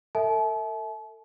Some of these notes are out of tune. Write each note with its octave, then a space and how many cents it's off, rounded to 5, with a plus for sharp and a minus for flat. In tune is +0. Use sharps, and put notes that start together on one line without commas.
A4 +40 E5 -20 A5 -40